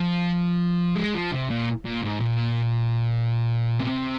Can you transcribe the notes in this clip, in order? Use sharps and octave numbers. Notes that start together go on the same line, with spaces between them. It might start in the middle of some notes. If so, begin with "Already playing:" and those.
Already playing: F3
G#3
F3
C3
A#2
A#2
G#2
A#2
C3